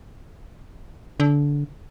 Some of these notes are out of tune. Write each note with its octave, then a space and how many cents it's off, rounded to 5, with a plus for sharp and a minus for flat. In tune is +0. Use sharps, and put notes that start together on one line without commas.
D3 -20